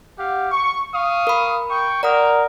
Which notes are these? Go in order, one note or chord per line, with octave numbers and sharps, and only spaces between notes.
G4 F5 F#5
C#6
F5 C#6 D#6
A#4 B5
G5 C#6
A#4 D5 F#5 D#6